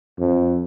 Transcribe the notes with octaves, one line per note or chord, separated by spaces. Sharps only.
F2